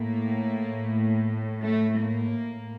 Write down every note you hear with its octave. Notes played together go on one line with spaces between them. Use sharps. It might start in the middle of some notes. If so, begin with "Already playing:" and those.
Already playing: A2 A#3
A3
A#3
A2